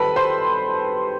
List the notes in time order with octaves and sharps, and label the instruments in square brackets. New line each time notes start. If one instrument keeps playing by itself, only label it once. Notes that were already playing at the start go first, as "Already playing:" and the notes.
Already playing: [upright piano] D#3 G3 C4 A4 B4 A5 B5
C5 C6